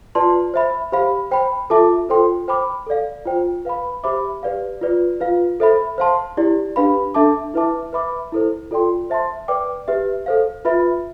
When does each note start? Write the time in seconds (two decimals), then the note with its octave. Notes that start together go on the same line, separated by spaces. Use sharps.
0.15 F4 B4 D5 A5 C6
0.54 C5 E5 B5
0.92 G4 C5 F5 B5
1.31 C5 G5 B5
1.70 F4 A4 E5 A5 D6
2.09 F4 A4 C5 G5 C6
2.48 C5 G5 B5 D6
2.86 A4 D5 F5
3.25 F4 C5 G5
3.65 B4 F5 B5
4.04 G4 C5 E5 B5 D6
4.43 G4 B4 D5 F5
4.82 F4 B4 D5
5.20 F4 B4 F5
5.60 A4 C5 E5 B5
5.98 C5 F5 A5 C6
6.37 E4 G4 D5
6.76 D4 G4 B4 F5 B5
7.14 D4 A4 E5 A5 D6
7.54 E4 B4 E5 A5 D6
7.93 B4 E5 B5 D6
8.32 E4 A4 C5
8.71 F4 A4 D5 G5 C6
9.10 C5 E5 A5 C6
9.48 B4 D5 G5 D6
9.88 G4 B4 E5
10.26 A4 C5 F5
10.65 F4 B4 E5 B5